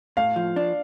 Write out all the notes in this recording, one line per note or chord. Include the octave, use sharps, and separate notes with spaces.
A2 F5
F3
D4